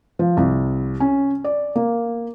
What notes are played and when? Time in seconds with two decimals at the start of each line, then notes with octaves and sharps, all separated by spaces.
0.19 F3
0.37 C2
1.00 C#4
1.44 D5
1.76 A#3